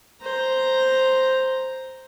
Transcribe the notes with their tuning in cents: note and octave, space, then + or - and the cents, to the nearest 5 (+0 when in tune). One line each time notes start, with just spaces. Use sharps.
C5 +0 A#5 +0